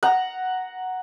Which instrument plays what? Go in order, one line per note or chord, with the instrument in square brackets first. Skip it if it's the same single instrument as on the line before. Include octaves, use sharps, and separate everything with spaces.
[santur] F#5 A#5